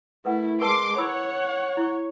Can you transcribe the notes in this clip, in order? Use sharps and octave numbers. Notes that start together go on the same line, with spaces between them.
A3 E4 A#4 B4 F#5
G#3 A#4 B4 A5 C6 D6
E4 C#5 F#5 B5 E6
E4 C#6